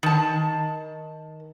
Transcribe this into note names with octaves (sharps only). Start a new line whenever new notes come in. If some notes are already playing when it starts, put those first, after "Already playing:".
D#3 A5